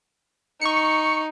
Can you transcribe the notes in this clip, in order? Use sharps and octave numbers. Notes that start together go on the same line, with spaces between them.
D#4 C#6 C#7